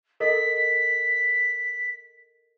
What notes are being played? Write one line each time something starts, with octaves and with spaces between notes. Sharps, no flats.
A4 A#4 D#5 B6